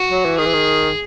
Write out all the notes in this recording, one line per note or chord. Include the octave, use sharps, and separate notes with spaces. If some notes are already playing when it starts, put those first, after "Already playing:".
Already playing: F#4
F#3
E3
D#3 G#4
E3
D#3